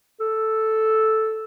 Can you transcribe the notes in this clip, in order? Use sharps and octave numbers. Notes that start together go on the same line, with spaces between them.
A4